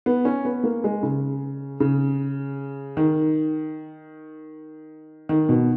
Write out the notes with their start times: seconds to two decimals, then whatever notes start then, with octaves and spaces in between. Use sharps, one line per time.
0.06 B3
0.25 C#4
0.45 B3
0.64 A#3
0.84 G#3
1.03 C#3
1.80 C#3
2.97 D#3
5.29 D#3
5.49 B2